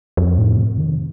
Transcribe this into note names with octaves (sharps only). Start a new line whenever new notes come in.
F2
A2
C3
D#3